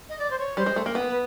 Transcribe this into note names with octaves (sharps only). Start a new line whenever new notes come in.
D#5
D5
C5
C#5
G3 C5
G#3
A3
A#3
B3
B4